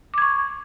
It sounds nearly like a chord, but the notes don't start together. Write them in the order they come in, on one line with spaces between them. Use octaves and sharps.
D6 G#6 C#6